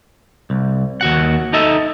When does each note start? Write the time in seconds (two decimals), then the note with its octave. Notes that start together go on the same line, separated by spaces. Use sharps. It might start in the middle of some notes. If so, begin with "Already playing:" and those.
0.50 C2
1.01 D#2 F#4 F#5
1.53 D#4 A4 D#5 E5